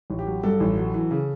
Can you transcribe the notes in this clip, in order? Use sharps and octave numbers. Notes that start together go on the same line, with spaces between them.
A1
G4
F#3
G2 A4
A1
F#3
E3
C#3